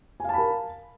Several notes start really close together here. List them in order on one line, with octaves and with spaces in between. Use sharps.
G#5 F5 A5 B5 A#4